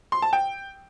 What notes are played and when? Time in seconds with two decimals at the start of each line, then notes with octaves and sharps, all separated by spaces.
0.12 C6
0.22 A5
0.33 G5